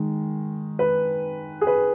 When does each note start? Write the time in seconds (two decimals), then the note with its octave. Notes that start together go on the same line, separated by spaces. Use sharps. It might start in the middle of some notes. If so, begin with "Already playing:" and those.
Already playing: D#3 G#3
0.79 B4
1.61 G#4
1.67 B4